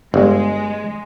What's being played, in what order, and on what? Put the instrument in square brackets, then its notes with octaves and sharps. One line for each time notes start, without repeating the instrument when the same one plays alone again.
[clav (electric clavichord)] G1 [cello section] G#3